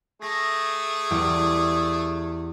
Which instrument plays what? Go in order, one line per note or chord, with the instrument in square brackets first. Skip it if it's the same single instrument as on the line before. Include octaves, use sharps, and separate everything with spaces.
[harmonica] A3 G#4 [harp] A#6
[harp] E2 G3 D5